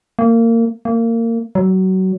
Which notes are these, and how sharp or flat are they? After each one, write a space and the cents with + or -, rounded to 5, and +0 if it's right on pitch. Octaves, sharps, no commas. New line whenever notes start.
A#3 -25
A#3 -25
F#3 +25